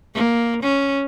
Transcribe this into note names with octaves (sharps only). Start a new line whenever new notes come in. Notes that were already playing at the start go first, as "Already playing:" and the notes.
A#3
C#4